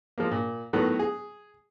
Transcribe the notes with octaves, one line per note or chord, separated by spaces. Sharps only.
F3 G#3 A#3
A#2
A2 D#3 F#3 A3 B3
G#4